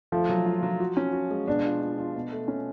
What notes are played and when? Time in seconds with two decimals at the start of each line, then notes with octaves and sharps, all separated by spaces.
0.12 F3 A3
0.29 F#3
0.46 F4
0.63 F#3
0.80 F#4
0.97 C#4
1.13 F#4
1.31 G#3
1.47 B2 D4
1.65 F4
1.82 F4
1.98 F4
2.15 B2
2.32 A3
2.48 C#4